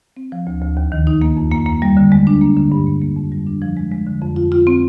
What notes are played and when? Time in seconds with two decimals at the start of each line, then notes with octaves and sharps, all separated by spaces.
0.17 C4
0.32 F3
0.47 D2
0.62 D2
0.77 D#2
0.92 D#3
1.07 D#4
1.22 A#3
1.37 F2
1.51 A#3
1.66 A#3
1.82 G3
1.97 D3
2.12 G#3
2.27 D4
2.41 A#3
2.57 D3
2.72 G2
2.87 A#3
3.02 A#3
3.17 F2
3.32 G3
3.47 D4
3.62 F3
3.77 G#3
3.92 G#3
4.06 D3
4.22 F2
4.36 F4
4.52 F4
4.67 C4